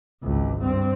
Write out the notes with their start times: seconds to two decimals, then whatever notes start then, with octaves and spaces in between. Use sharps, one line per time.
0.23 G#1 C#2
0.60 G2 C4